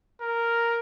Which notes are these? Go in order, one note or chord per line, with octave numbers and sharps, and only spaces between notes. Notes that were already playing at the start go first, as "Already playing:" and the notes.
A#4